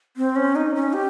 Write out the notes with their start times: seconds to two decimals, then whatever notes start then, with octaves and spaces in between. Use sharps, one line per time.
0.17 C4
0.36 C#4
0.55 D#4
0.75 C#4
0.93 G4